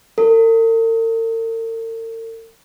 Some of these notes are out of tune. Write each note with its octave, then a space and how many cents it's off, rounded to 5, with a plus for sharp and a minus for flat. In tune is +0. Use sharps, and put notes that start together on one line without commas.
A#4 -45